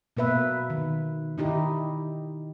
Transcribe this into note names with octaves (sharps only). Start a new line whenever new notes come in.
B2 A#3 B4 E5
D#3
D#3 D#4 E4 G4